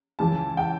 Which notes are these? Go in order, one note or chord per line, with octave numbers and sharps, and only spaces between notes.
C#2 C#3 E3 A5
G5